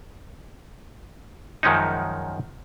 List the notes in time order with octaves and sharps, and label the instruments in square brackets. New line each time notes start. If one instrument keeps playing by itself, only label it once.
[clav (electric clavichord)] F#2 D#3 F3 G#3 C#4 D#4